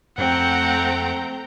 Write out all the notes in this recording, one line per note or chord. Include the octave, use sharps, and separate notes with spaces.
F2 A3 C4 F#5 G5 A#5